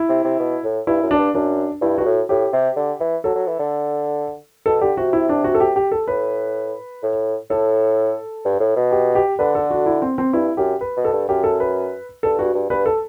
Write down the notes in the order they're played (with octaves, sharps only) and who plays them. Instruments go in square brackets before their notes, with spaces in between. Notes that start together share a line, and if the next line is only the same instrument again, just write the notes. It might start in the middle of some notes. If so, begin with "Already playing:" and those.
Already playing: [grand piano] E4
[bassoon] C3
C3
B2
A2
[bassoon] G2 [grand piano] E4
[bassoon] F#2
[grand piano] D4
[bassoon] G2
[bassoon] F#2 [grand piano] D4
[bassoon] G2 [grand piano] E4
[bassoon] G2 [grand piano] F#4
[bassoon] A2
[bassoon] A2 [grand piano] G4
[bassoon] C3
D3
E3
[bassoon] F#3 [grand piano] A4
[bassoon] F#3
E3
D3
[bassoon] B2 [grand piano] A4
[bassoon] D3 [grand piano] G4
[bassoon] C3 [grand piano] F#4
[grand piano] E4
D4
F#4
A4
G4
G4
A4
[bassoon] A2 [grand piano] B4
[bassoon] A2
[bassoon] A2 [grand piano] A4
[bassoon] G2
A2
B2
[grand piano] G4
G4
[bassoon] D3 [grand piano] B4
[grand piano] A4
F#4
E4
C4
C4
[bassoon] G2 [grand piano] E4
[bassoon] F#2 [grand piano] G4
[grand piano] B4
[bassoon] B2
[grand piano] A4
[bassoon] G2
[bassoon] F#2 [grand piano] G4
[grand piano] A4
B4
[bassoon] G2 [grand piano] A4
[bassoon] G2 [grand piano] F#4
[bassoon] G2
[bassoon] G2 [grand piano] B4
[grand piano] A4